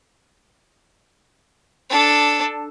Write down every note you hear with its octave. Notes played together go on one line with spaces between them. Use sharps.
D4 A4